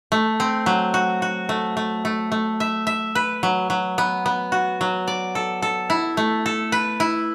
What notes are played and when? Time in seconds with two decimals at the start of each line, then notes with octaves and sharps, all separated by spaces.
0.12 A3
0.40 C4
0.66 F#3
0.94 F#4
1.22 F#4
1.49 A3
1.77 A3
2.05 A3
2.32 A3
2.60 E5
2.87 E5
3.15 B4
3.43 F#3
3.70 F#3
3.98 B3
4.26 B3
4.52 F#4
4.81 F#3
5.08 D5
5.35 A4
5.62 A4
5.90 E4
6.17 A3
6.46 A4
6.72 B4
7.00 E4